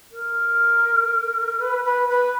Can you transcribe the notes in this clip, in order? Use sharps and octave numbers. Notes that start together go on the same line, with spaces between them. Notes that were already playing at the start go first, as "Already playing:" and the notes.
A#4
B4
B4
B4